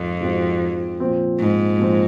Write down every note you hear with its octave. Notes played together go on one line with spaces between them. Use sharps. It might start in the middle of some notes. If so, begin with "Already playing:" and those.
Already playing: F2 G#2 F3 C4
G#2 F3 C4 F#4
A#2 F3 C4
G#2
A#2 F3 C4